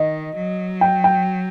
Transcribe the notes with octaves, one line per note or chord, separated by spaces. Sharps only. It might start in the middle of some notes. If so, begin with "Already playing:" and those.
Already playing: D#3 D#5
F#3
G5
G5